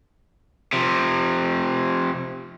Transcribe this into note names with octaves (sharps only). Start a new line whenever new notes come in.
C3 F3